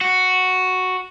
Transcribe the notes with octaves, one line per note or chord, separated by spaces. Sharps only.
F#4